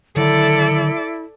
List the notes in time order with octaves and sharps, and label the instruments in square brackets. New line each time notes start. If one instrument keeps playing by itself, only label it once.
[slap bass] D3 D#3 F#3 [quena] E4 [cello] A4 D5